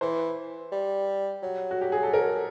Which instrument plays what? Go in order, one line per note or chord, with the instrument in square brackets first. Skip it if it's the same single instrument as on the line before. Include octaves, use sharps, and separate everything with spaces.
[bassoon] E3 [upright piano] C5
[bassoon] G3
F#3
[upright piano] F#4
G4
G#4
A4
A#4